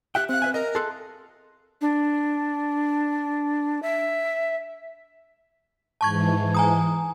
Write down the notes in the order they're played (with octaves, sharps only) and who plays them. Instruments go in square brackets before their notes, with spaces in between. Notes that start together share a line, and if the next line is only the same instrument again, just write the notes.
[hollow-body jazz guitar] G4 E5 G5 [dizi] F#6
[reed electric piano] C4 F5 [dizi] F#6
[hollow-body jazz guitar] B4 E5 G#5
[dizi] A#4 [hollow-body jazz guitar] D#5
[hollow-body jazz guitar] G#4 A4 [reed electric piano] A5 C6 F#6
[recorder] D4
E5
[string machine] G#2 E3 [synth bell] A5 C#6 G#6
[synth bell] G#5 A#5 D#6